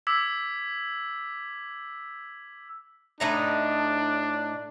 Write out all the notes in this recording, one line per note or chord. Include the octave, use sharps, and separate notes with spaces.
D6 E6 G#6 B6
A2 D4 D#4 A#5